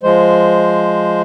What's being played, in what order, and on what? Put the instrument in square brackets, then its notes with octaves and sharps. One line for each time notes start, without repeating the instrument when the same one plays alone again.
[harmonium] F3 G#3 C5